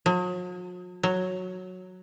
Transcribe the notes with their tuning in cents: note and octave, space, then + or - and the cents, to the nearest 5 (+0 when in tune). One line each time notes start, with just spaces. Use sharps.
F#3 -45
F#3 -5